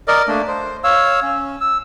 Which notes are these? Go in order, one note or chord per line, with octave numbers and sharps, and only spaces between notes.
A#4 D5 D#5
A3 A#3 D4
C5
C#5 F5 E6
C#4
E6